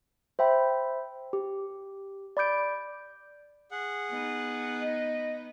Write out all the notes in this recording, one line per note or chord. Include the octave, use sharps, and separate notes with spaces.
C5 E5 G5 B5
G4
D5 B5 D6 G6 D7
G#4 F#5
B3 D#4
D#5